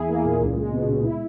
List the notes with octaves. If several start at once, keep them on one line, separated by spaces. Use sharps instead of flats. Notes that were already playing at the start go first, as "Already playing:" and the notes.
Already playing: E2 E4 G#4
A#3
A#2
C#2
G#3
B2
C#2
E4